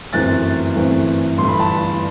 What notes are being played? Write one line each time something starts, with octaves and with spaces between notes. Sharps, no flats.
G1 F#2 E3 A3 C4 F#6 A6
G1 F#2 E3 A3 C4
G1 G2 E3 A3 C6
B5
A5 C6